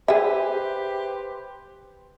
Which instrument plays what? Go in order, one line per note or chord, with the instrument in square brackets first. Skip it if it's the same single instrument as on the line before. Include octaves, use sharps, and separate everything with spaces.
[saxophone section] G4 B4 C5 [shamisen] G#4 E5